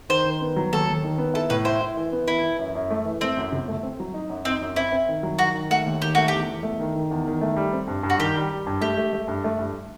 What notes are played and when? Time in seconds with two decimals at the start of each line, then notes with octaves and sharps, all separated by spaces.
0.09 D#3 C5
0.25 D#3
0.41 B3
0.56 F#3
0.73 D#2 A4
0.88 D#2
1.04 D#3
1.18 B3
1.34 E4 A4
1.50 A2 B4
1.65 E4 C5
1.81 E4
1.97 E3
2.12 B3
2.27 E3 E4
2.43 E3
2.59 F#2
2.75 F#2
2.90 A3
3.05 E3
3.21 A3 C4
3.37 F#2
3.53 G1
3.68 A3
3.83 C4
4.00 F#3
4.14 D#4
4.30 F#2
4.45 C4 D#4
4.61 F#2
4.76 C4 E4
4.92 C4
5.09 D#3
5.23 F#3
5.39 D#3 F#4
5.54 D#3
5.71 A3 F#4
5.86 D#2
6.02 D#3 G4
6.15 A3 F#4
6.28 E2 G4
6.48 E2
6.63 A3
6.79 D#3
6.95 D#3
7.11 E2
7.27 D#3
7.41 A3
7.56 G3
7.73 C4
7.88 G2
8.03 G2
8.10 F#4
8.19 D#3 G4
8.35 G3
8.51 G3
8.67 G2
8.81 A3 G4
8.97 A3
9.13 A3
9.28 G2
9.44 A3
9.59 G2